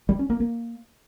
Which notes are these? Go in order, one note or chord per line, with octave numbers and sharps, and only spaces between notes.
G3
C#4
A#3
A#3